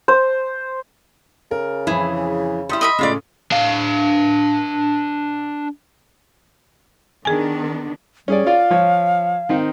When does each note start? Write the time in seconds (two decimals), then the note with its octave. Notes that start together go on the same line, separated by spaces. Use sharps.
0.08 C5
1.51 C#3 A#4
1.87 F2 E3 E4 G#4
2.69 G3 E4 C6 D#6
2.81 D#5 E5 B5
2.99 A2 C#3 G#3 F4 D5
3.52 D4 F5
7.25 D#3 B3 D4 G#4 G#5
8.28 G3 C#4 G#4 D5
8.46 F4 D5 F5
8.70 F3 C#5
9.49 D#3 C4 D#4